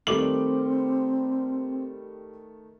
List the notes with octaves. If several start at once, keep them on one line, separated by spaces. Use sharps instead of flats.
D#3 G3 A3 C4 D6 F#7